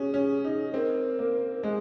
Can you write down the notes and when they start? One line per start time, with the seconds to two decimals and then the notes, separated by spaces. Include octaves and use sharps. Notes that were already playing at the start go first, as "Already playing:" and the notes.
Already playing: C#4 F#4 G#4
0.14 C#4
0.44 D#4
0.73 C4 A#4
1.19 A#3
1.63 G#3 G#4